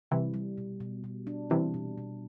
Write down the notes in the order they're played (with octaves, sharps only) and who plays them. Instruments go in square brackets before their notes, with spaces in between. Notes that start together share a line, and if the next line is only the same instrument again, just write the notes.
[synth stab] C3 E3 [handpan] G3
[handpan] G3
B2
B2
B2
D4
[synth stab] C3 E3 [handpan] G3
[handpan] B2
B2